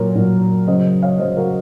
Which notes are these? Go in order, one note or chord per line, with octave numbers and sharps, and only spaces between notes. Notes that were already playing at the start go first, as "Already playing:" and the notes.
Already playing: A#2 F#3 A#4 C#5
A#2 F#3
C#3 F#3 C5 D#5
C#5 F5
C#3 F#3 C5 D#5
F#4 A#4